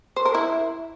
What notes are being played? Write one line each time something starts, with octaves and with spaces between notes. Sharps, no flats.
C5
A#4
E4